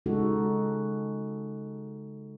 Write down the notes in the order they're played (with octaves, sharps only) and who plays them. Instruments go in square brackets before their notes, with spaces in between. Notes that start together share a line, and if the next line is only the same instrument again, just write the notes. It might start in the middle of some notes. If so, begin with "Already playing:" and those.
[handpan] C#3 G#3 D#4 F#4 A4